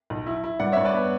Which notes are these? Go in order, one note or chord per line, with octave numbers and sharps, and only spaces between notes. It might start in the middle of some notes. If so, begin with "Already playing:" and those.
B1
E4
E4
G2 D5 F#5
G2 C#5 E5
B4 D5
B3